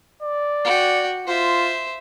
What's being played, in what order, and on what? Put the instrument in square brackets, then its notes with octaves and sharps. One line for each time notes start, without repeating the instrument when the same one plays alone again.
[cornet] D5
[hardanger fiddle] F#4 G5
[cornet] F4 [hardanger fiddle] C5 E5